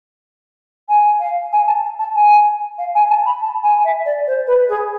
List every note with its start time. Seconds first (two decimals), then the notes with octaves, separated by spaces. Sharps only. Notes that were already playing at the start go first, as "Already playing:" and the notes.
0.88 G#5
1.19 F5
1.52 G#5
1.67 A5
1.99 A5
2.15 G#5
2.78 F5
2.94 G#5
3.10 A5
3.25 B5
3.41 A5
3.63 G#5
3.84 E5
4.05 D5
4.26 C5
4.46 B4
4.68 G#4